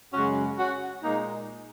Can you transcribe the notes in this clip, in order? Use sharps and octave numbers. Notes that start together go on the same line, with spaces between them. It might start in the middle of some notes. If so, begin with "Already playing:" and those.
F#2 C#3 G#3 C#4 F#4
C#4 F#4
A#2 G#3 A#3 D#4